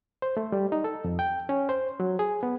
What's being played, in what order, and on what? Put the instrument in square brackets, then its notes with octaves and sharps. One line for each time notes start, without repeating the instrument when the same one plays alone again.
[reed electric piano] C5
A3
G3
D#4
A4
F2
G5
C#4
C5
F#3
G#4
B3